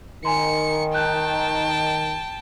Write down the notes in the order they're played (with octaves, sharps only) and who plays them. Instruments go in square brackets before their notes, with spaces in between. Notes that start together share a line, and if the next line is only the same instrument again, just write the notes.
[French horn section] D#3 [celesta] G#5 A#5 C6 [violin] C#7
[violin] G5 A5 [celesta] F#6 G6